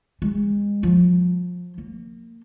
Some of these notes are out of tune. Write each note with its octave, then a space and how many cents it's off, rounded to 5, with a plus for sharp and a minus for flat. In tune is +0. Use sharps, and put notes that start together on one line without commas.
G#3 -30
F3 +25
A#3 -25